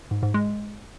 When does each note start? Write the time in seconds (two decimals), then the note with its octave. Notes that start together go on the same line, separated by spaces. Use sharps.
0.11 G#2
0.23 G#2
0.34 G#3